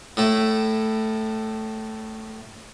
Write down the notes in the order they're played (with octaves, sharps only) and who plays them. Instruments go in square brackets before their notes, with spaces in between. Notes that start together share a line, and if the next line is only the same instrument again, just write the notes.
[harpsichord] A2 A3 E4